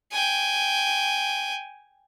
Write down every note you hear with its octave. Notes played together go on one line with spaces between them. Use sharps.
G5 G#5